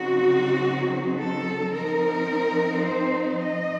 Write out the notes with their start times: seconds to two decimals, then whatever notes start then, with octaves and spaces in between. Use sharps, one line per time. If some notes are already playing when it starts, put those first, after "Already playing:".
Already playing: C#3 F#3 C4 D#4 F#4
1.18 A4
1.73 F3 C4 D#4 A#4
2.85 C5
3.39 D#5